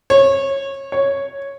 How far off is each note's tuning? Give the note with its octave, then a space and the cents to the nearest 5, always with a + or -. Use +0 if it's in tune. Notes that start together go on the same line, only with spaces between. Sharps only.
C#5 -20
C#5 -5